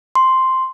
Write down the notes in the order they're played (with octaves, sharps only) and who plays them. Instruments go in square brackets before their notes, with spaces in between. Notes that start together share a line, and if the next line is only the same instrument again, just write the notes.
[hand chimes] C6